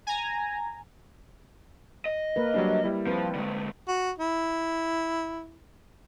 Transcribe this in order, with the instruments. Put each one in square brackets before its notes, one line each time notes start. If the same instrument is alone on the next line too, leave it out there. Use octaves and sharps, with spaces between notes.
[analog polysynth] G#5 A#5
[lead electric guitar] D#5
[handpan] A#3 A#4 B4
[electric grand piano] F#3 G3 D4
G3 E4
[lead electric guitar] F3 [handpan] C4 B4
[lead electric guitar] D3 G#3
[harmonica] F#4
E4